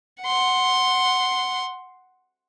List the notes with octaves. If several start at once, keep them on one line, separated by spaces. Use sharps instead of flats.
F#5 C6